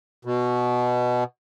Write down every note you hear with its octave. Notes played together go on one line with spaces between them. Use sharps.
B2